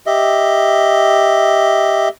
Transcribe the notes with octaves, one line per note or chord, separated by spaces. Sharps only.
G4 D#5 E5